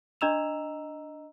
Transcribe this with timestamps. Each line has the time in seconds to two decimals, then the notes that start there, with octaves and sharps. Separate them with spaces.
0.21 D4 D#5 A#5 E6 E7 F7